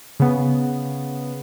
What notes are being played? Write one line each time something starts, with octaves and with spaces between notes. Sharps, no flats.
C#3 B3